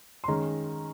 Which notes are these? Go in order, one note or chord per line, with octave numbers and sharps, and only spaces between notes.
C6
D#3 G#3 C#4 A#5